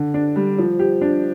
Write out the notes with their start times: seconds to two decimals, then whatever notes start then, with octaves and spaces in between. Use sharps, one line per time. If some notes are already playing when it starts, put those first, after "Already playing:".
Already playing: D3
0.14 D4
0.36 G3
0.58 F3
0.79 G4
1.01 D4